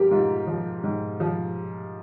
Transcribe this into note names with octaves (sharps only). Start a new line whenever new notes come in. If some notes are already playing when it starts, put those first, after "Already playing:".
Already playing: G#2 F3 G4 A#4
G#2 F4
F3
G#2
F3